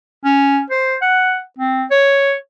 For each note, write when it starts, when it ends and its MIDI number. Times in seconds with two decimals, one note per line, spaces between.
0.25 0.61 61
0.70 0.96 72
1.02 1.41 78
1.59 1.84 60
1.90 2.34 73